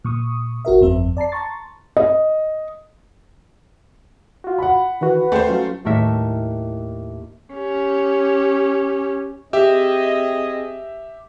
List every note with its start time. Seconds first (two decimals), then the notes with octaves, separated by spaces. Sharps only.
0.05 A#2 C#6 D#6
0.65 G#1 F#4 A#4 E5
0.81 G1 F2 C4 E5
1.17 D5 A5 A#5 C7
1.32 A5 A#5 C6 C#6 A6
1.97 D#5
4.44 F4 F#4
4.58 F#5 B5
5.01 D#3 E3 F#4 B4
5.32 D#2 A3 C5 G5
5.48 F#3 C#4 F4
5.85 D#2 A2 A3 A#4 E5
7.54 C#4 G4
9.53 C4 G4 G#4 D#5 E5